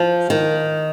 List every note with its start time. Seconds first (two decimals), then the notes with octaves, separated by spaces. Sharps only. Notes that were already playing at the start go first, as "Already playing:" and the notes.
Already playing: F3
0.30 D#3